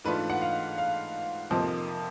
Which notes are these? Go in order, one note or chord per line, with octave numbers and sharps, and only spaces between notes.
G#2 E3 A3 D4 F4 B4
F#5
F5
F5
F2 C3 F3 A#3 D#4